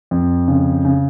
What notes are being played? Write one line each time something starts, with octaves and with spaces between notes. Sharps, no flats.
F2
C#3
C#3